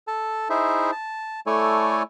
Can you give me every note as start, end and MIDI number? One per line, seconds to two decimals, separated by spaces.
0.08 0.48 69
0.08 0.48 81
0.50 0.91 63
0.50 0.91 64
0.50 0.91 68
0.50 0.91 72
0.50 0.91 76
0.92 1.40 81
1.47 2.03 57
1.47 2.03 64
1.47 2.03 69
1.47 2.03 73
1.47 2.03 74
1.47 2.03 80